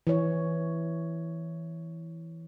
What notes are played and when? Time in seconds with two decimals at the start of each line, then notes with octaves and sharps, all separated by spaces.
0.07 E3 C#5